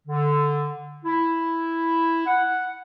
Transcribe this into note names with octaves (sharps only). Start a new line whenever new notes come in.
D3
E4
F#5